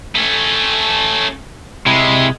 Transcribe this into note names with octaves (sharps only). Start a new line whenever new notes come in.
A3 C#4
C3 G#3 E4